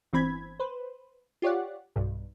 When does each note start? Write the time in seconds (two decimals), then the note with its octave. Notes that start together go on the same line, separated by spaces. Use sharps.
0.13 G1 E3 C4 B5 G#6
0.60 B4 C5
1.42 F4 G4 C#5 D5 F#5
1.96 B1 G2